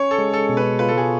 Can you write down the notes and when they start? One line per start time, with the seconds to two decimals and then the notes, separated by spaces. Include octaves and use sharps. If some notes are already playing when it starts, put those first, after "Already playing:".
Already playing: C#4 C#5
0.11 A4
0.18 G#3
0.34 A4
0.49 B2
0.57 B4
0.79 F4 B4
0.88 A4
0.98 G#4